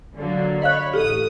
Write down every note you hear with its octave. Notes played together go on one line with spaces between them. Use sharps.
D3 F#3 A#3
C#5 D#5 F5 B5 F#6
A1 G4 A4 D#6